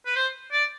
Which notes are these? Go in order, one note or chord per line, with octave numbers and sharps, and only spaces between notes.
B4
C5
D5